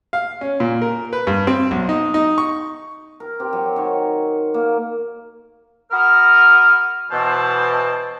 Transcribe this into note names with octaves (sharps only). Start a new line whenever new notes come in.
F5
C#4
A#2
A#4
B4
G2
C4
B1
D#4
D#4
C#6
A#4
C4 G4
F#3
D#3 C#5
A#3
F#4 A#4 B5 D#6 F6
B2 E3 C5 A5